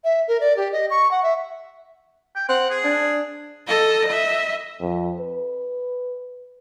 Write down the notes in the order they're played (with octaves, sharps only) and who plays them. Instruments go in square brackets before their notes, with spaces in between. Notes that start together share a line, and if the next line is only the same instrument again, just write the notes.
[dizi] E5
A#4
D5
G4
D#5
C#6
F#5
E5
[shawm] G5
[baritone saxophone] C4 [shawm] F#5
[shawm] G#4
[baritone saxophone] D4
[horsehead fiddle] A4 D#5
D#5 E5
[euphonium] F2
B4